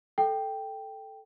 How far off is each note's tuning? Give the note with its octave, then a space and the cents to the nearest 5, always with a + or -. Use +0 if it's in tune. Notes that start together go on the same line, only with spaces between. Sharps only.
A4 +0 G5 +0